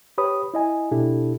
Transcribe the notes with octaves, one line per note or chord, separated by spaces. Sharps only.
G4 B4 C#5 B5 D#6
E4 D#5 G#5
B2 D4 E4 G4 A4